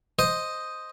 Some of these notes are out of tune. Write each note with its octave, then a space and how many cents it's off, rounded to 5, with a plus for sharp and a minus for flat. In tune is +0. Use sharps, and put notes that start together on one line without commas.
C5 +0 D#5 +0